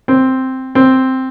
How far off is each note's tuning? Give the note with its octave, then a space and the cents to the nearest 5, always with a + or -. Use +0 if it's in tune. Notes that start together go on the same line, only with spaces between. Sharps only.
C4 +0
C4 +0